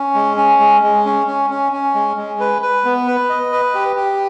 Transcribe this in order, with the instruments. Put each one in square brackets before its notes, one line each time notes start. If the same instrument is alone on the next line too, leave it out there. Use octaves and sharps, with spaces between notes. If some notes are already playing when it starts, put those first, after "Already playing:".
Already playing: [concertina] C#4
G#3
C#4
G#3
G#3
C#4
C#4
C#4
C#4
G#3
G#3
B4
B4
B3
B4
D#5
B4
G4
G4